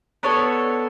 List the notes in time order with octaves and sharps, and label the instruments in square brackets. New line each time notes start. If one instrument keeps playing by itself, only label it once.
[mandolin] B3 D4 A4 C#5